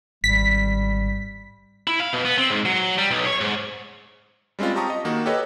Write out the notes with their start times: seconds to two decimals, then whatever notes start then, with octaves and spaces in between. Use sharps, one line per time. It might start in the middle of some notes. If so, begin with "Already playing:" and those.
0.24 G#1 G3 B6
1.87 E4
2.00 F5
2.13 B2
2.25 B3
2.38 C4
2.50 G#2
2.66 F#3
2.98 G3
3.11 B1
3.26 C#5
3.41 G#2
4.59 G3 G#3 C4 C#4 F4
4.76 G4 A5 A#5 C#6 D#6
4.90 D#5
5.05 D#3 A#3 F#4
5.26 G4 A4 B4 C#5 D#5